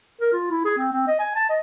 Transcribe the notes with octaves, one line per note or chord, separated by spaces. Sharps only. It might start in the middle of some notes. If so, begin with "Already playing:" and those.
A#4
F4
E4
G#4
C4
C4
D#5
G#5
A5
D#5